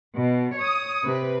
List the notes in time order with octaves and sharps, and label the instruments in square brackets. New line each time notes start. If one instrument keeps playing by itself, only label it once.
[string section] B2
C#5 D#6
C3 B4